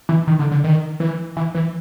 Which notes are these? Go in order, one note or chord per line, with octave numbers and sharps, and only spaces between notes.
E3
D#3
D3
D3
D#3
E3
E3
E3